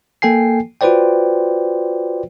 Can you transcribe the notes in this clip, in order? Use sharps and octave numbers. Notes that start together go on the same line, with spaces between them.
A#3 A4 G5 G#5 C7
F4 F#4 B4 C5 D5 G5